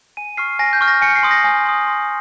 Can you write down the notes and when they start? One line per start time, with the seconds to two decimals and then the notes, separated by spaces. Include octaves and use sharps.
0.17 G#5 D#7
0.37 C#6 F6 C7
0.59 G#5 A#6
0.73 G6
0.81 C#6 F6
0.88 A#6
1.02 G#5 C#7
1.16 C7
1.23 C6 D#6
1.31 A#6
1.44 G#5
1.66 C6 D#6
1.87 C6